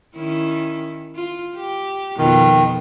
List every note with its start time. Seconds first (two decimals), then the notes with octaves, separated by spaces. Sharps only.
0.16 D#3 C#4 E4
1.15 F4
1.56 G4
2.18 F2 B2 D#3 F4